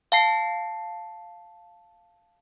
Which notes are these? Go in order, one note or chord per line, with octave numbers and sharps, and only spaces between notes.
F5 A5 C7